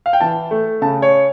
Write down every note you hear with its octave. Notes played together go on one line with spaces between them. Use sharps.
F5
G5
E3 A5
A3
C#3 A5
C#5